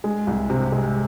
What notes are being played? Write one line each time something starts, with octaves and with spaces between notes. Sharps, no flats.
G#3
C2
C3
G#3